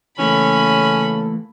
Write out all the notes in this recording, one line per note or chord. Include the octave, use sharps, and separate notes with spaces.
C#3 E3 A3 A#3 C#4 A4 B5